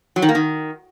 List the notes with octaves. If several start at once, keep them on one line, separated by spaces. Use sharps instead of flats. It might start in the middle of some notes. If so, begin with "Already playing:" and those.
F#3
D#3
A#3
D#3